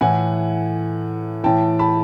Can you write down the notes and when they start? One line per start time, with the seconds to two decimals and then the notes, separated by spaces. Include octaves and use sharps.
0.01 A2 E3 F#5 G#5
1.43 A2 E3 G5 A5
1.79 A5 B5